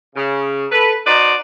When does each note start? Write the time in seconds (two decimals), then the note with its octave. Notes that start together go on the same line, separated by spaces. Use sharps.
0.15 C#3
0.71 A4 B4
1.06 D#4 F#4 B4 C5 D5